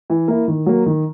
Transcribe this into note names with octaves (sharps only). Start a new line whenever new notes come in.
E3
A#3 E4
D#3
F#3 A#3
D#3